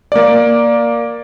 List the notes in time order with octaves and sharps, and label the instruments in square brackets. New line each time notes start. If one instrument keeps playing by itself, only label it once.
[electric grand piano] A#3 D5